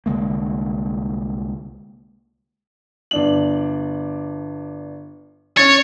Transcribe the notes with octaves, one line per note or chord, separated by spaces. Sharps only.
C2 D3 G#3 A#3
G1 D4 F#7
C#4 C#5 A6